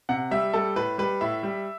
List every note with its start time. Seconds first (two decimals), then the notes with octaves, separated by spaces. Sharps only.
0.09 C3 F#5
0.31 G3 E5
0.53 G3 A4
0.76 A2 B4
0.98 G3 B4
1.21 A2 E5
1.43 G3